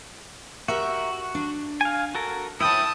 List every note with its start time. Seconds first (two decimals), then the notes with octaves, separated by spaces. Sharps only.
0.68 F#4 G4 A#4 E5
1.35 D4
1.81 F5 G#5
2.15 F#4 A4 A#4
2.60 E4 B4 C#5 E5 G5 A5 D#6